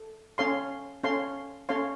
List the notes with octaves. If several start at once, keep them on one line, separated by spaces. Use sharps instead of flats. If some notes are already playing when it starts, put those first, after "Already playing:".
Already playing: A4
C#4 A4 C#5 F5 C6
C#4 A4 C#5 F5 C6
C#4 A4 C#5 F5 C6